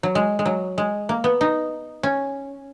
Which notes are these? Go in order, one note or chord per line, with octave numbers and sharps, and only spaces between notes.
F#3
G#3
G#3
F#3
G#3
A#3
B3
D#4
C#4